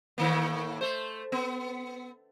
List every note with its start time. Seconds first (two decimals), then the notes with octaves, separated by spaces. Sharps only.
0.18 A2 D#3 A#3
0.81 A3 C5
1.32 B3